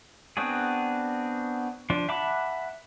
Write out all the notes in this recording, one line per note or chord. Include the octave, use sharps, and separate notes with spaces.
B3 C4 D4 F#4 G#4
F3 D4
E5 F#5 A5 B5 D6